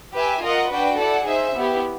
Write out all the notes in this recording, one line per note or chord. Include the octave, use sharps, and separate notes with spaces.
G4 B4 E5 G#5
F4 A#4 D#5 F#5
D4 F#4 B4 D5 G5
E4 A4 D5 F#5
D#4 G#4 C5 E5
B3 E4 G4